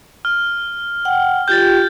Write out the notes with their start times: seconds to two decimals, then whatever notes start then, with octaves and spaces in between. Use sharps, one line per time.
0.25 F6
1.05 F#5 G5
1.48 F4 G4 G5 G6 A6